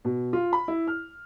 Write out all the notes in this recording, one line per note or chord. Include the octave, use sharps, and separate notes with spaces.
B2
F4
B5
E4
F6